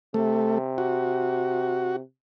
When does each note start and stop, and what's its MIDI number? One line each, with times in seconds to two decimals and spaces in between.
0.14 2.01 48
0.14 0.58 57
0.78 1.96 66